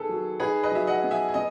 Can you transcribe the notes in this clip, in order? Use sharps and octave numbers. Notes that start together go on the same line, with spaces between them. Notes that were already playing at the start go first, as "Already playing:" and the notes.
Already playing: D#3 B3 G#4 A4 B4
F#3
D#4 G#4 B4
B4 D#5
F#3 E5
D#5 F#5
B3
E5 G#5
G#5
B3 D#5